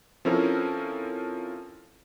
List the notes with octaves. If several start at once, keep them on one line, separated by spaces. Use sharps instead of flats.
F3 C4 C#4 E4 A4 A#4